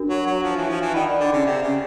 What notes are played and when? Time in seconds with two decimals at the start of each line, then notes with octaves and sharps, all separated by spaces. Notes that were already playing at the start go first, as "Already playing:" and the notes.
Already playing: D4 F#4 A#4
0.09 F#3
0.26 F#3
0.43 F3
0.56 E3
0.69 F3
0.81 E3
0.94 D#3 A#4 D5 F#5 B5
1.20 D3
1.33 C#3
1.46 C3
1.62 C#3